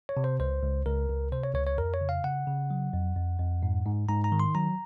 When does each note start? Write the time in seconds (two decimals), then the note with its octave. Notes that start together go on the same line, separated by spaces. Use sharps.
0.09 C#5
0.17 C3
0.24 C5
0.40 C#2 C5
0.63 C#2
0.86 C#2 A#4
1.09 C#2
1.32 C3 C5
1.44 C#5
1.55 C#2 C#5
1.67 C#5
1.78 F2 A#4
1.94 C#5
2.01 C#3
2.09 F5
2.24 C#3 F#5
2.47 C#3
2.71 F#3
2.94 F2
3.16 F2
3.40 F2
3.63 G#2
3.86 G#2
4.09 G#2 A#5
4.24 A#5
4.32 D#3
4.40 C6
4.55 F#3 A#5